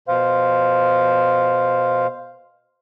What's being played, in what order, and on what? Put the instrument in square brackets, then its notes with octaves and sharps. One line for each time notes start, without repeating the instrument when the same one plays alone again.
[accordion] B2 C5 F5